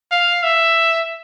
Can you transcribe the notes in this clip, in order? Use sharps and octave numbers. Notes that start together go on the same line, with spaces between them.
F5
E5